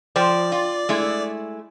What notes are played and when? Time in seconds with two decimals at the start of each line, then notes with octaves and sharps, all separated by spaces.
0.16 F3 C5 D5 G5
0.52 F4
0.89 G#3 A3 E4